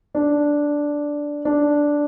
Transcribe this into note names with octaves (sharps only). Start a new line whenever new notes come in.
D4
D4